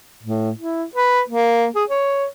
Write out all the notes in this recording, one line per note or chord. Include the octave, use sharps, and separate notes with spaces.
A2
E4
B4
A#3
G#4
C#5